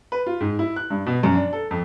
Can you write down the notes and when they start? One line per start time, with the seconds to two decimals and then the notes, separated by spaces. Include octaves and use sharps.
0.12 B4
0.26 F4
0.40 G#2
0.59 E4
0.76 F#6
0.90 G2
1.06 B2
1.23 F#2
1.35 D4
1.53 A4
1.71 F2